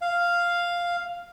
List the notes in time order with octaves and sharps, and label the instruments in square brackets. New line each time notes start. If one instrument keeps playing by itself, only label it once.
[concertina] F5